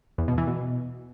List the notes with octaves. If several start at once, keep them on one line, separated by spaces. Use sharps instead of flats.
E2
B2
E3
B2